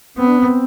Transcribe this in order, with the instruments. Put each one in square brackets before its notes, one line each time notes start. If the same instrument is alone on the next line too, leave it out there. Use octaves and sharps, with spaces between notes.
[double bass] B3 [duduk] C4
[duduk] D4
C4